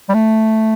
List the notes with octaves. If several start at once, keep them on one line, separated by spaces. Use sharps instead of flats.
G3
A3